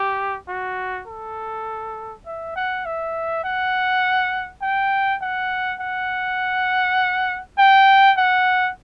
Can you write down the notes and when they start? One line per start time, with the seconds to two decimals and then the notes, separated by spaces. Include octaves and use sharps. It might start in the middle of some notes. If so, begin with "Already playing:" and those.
Already playing: G4
0.48 F#4
1.07 A4
2.26 E5
2.56 F#5
2.85 E5
3.44 F#5
4.62 G5
5.22 F#5
5.80 F#5
7.58 G5
8.18 F#5